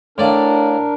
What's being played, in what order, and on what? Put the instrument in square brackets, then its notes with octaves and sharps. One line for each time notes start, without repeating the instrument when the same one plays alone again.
[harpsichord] A2 D5 F5 [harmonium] D4 A#4